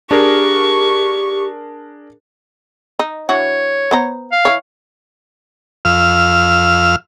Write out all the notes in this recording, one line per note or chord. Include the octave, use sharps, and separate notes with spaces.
D4 G4 G#4 A#4 C#6
D#4
E3 D4 F#4 C#5
B3 C5 A#5
F5
E3 C#5
F2 F5 E6 F6